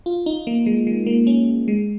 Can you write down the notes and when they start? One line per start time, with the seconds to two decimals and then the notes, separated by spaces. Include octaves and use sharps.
0.06 F4
0.26 D#4
0.47 A#3
0.66 G#3
0.87 G#3
1.06 A#3
1.27 C#4
1.68 G#3